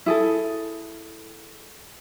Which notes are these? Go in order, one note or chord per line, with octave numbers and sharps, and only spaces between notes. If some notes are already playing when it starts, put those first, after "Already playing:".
E4 G#4 A4